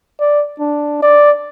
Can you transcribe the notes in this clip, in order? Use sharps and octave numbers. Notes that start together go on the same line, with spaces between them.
D5
D4
D5